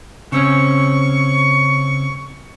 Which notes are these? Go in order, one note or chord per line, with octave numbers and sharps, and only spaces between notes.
C#3 C4 C#4 C#6